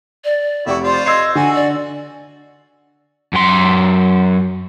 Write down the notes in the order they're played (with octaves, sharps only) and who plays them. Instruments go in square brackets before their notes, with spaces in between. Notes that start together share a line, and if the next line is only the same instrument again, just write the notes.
[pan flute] D5
[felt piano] F1 G4 C#6 [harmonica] E4 F#4
[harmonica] F4 C5 [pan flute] D5
[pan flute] D#5 [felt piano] E6 G#6 C7
[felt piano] D3 [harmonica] F#4 [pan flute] G#5
[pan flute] D5
[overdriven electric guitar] F#2 C6